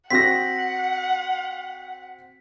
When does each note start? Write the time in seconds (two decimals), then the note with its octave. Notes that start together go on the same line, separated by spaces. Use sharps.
0.11 C4 F#4 F#5 A#6 B6